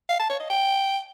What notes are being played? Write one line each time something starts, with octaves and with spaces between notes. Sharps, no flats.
F5
A5
C#5
D#5
G5